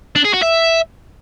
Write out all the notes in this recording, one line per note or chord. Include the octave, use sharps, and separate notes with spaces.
D4
G#4
F#4
E5